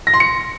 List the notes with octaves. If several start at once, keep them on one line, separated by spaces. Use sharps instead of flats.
A#6
C6
C#7